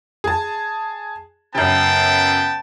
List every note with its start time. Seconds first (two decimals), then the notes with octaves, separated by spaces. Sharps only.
0.24 G#4 A5
1.55 F#2 C#3 B3 G5 A5